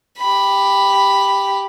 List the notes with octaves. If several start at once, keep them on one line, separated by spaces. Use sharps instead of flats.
G4 B5